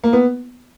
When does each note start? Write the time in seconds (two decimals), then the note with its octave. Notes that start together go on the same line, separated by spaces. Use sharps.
0.04 A#3
0.13 B3